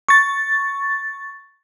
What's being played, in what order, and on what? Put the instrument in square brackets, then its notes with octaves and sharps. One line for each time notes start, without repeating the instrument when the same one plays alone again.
[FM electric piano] C#6 A6